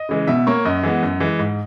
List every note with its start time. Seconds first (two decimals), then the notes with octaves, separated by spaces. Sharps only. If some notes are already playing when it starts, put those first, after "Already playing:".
Already playing: D#5
0.09 C#3 E3 G#3
0.27 B2 E5
0.47 A#3 C#5
0.65 F#2 D#5
0.83 E3 G#3 B3
1.03 F#2
1.20 E3 G#3
1.39 G#2